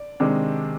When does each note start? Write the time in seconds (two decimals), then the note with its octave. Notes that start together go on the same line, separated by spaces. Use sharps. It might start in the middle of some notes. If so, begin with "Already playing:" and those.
Already playing: D5
0.20 C3 D#3 G#3 D4